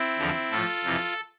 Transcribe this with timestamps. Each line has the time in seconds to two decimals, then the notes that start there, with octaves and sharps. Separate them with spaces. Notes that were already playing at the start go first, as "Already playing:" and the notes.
Already playing: C4 E4
0.18 E2 D3 F3
0.51 A2 F3 F4 A4
0.85 F2 C3 E3